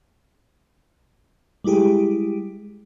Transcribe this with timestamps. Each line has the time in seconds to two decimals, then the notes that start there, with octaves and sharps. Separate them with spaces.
1.64 G3 G#3 E4 G4 G#4